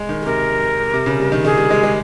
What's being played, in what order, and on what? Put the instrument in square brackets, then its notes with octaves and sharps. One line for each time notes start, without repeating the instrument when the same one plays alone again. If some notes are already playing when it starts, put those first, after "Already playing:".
Already playing: [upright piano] G#3
D#3
[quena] G#4
[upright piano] C3 [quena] A#4
[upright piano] C3
C#3
G3
D#3
[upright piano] D#3 [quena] G#4
[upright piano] G3
G#3
G#3